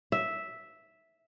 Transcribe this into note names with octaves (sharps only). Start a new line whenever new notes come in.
E5